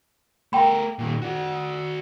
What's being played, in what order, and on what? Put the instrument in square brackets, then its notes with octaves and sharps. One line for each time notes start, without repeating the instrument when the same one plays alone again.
[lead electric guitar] A3 A#4 [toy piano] G5 B5
[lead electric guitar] A#2 D#3
F#4 D5